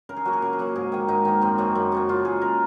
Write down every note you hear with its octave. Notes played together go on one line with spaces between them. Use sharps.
C#3 A#4
G#4
F#3 A#3 F#4
G#4
C#3 A#4
G#4
F#3 A#3
G#2 G#4
D#3 A#3
G#2 D#4
D#3 A#3
F#2 C4
C#3 F#3 A#3
F#2
C#3 F#3 A#3
C#3 F4
G#3 G#4
C#3 A#4